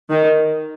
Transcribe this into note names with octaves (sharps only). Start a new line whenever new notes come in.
D#3